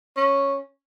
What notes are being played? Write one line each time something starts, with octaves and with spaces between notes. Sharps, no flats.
C#4